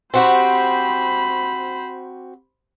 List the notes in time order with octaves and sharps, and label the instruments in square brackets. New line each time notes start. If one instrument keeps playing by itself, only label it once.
[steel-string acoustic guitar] C4 F#4 G4 [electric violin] C5 B5